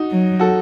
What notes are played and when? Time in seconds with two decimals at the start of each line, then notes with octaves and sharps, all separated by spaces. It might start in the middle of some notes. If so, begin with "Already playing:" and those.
Already playing: D#4 F#4
0.11 F#3
0.39 F#4 A4